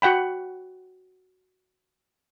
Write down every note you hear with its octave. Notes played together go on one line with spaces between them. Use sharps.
F#4 F#5 G5 B5